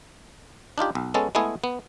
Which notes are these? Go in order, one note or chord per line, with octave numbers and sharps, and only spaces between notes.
D4 D#4 F4 G4
B1
G#3 B3 C#4 A4
G#3 A3 B3 E4 G#4
B3